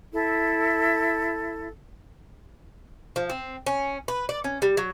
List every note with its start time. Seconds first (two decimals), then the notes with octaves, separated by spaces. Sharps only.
0.13 E4 A4
3.16 F3
3.30 C4
3.66 C#4
4.08 B4
4.29 D5
4.44 C#4
4.62 G3
4.77 F#3